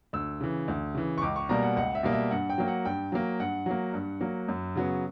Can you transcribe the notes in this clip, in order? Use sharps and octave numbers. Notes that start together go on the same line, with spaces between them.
D2 E6
C#3 E3
D2
C#3 E3
C#6
C#2 D6
C#6
B2 G3 A#3 A#5
F#5
C#2 F#5
E5
B2 G3 A#3
E5
G2 F#5
G5
F#3 A#3
F#5
G2 G5
F#3 A#3
G2 F#5
F#3 A#3
G2
F#3 A#3
F#2
C#3 F#3 B3